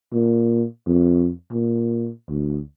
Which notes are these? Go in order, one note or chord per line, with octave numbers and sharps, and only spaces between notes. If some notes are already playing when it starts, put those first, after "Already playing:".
A#2
F2
A#2
D2